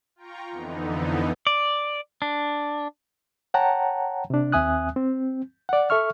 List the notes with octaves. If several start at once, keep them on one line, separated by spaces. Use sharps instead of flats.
F4 G5 A#5 C#6
F2 D3 E3 B3 D#4
D5
D4
C#5 F#5 G5 A5 A#5
C3 D4
D#2 C4 E5 G#5 D#6 F#6
C4
D5 F#5
A4 E5 C#6 F6